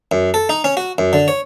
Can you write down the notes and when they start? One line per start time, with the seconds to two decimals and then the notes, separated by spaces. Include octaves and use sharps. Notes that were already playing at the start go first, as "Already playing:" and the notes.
0.12 F#2
0.34 A4
0.49 D#4
0.64 C#4
0.77 F#4
0.98 F#2
1.13 D3
1.28 C#5